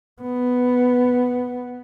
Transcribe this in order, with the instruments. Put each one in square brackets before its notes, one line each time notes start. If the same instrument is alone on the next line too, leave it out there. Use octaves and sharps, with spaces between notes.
[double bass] B3